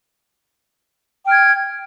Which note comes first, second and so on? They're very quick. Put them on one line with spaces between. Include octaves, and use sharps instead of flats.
G5 F6 G#6